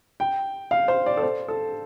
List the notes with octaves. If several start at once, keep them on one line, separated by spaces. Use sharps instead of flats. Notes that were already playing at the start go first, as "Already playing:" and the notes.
G5
F5
C5
D5
A4
C5
A4